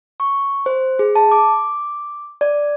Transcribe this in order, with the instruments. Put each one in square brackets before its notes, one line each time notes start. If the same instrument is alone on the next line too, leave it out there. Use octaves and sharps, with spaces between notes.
[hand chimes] C#6
C5
G#4
A5
D6
D5